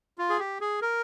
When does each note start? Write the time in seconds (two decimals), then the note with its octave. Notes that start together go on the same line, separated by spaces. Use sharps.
0.18 F4
0.30 G#4
0.39 G4
0.61 G#4
0.82 A#4